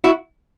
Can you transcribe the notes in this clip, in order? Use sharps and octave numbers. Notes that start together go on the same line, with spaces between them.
E4 F#4